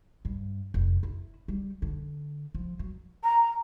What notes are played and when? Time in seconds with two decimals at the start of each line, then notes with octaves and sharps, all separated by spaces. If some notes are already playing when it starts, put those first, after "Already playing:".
0.25 G2
0.74 F1
1.03 E4
1.48 G3
1.82 D3
2.55 F3
2.79 F#3
3.24 A#5